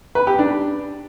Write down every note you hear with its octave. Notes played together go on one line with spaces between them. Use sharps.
B4
G4
D4